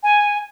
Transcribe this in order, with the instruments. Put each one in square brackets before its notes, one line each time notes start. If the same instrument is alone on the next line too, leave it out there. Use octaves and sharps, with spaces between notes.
[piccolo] G#5